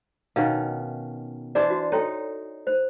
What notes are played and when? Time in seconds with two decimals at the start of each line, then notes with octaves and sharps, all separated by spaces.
0.36 B2 D#3 C#4 F5
1.55 E3 D4 C5 D5
1.70 F#4
1.92 D#4 A4 C#5 G5
2.67 C5